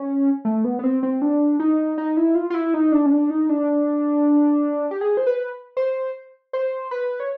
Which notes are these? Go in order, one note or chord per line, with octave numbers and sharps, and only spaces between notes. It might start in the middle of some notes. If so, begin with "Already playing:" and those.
Already playing: C#4
A3
B3
B3
C4
C4
D4
D#4
D#4
E4
F4
F4
E4
D#4
D4
C#4
D4
D#4
D4
G4
G#4
C5
B4
C5
C5
B4
C#5